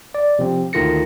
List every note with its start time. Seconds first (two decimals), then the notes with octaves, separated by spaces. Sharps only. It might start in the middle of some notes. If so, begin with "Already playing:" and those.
0.15 D5
0.39 C3 F3 C4
0.73 D2 D#3 F4 A4 A#6 C#7